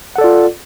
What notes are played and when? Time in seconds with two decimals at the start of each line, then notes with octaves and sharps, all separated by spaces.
0.16 F#5
0.18 A4
0.21 D5
0.24 F4